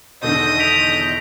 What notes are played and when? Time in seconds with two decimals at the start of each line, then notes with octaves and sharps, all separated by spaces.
0.23 E2 B2 D3 D#3 D#5 D#6 G6
0.59 B6 D7 F7